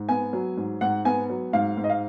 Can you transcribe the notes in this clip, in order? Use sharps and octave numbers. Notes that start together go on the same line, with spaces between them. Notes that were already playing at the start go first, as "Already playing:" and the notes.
Already playing: G#2
B3 G#5
F#3
G#2
G#2 F#5
B3 G#5
F#3
G#2 F5
G#2
D#5
F5